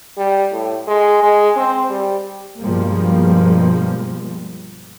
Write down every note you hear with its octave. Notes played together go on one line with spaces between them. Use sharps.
G3
A2
G#3
G#3
C4
G3
G2 B2 F3 G3 G#3 A#3